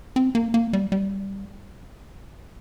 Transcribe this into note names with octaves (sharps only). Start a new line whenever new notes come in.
C4
A#3
A#3
G3
G3